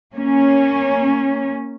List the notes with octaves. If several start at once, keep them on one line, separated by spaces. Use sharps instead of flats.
A#3 C#4